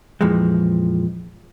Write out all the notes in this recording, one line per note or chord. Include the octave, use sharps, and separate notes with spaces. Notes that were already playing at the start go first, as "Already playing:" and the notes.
F2 A#2 E3 F3 G#3